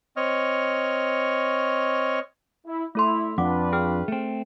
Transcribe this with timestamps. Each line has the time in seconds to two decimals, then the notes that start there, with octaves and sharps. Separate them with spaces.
0.17 C4 C#5 D#5 C#6 F6
2.66 E4
2.95 A3 E4 A4 C6
3.38 F2 D4 F4 B4 F#5 D6
3.73 G#4 G5 F6
4.08 A3 C4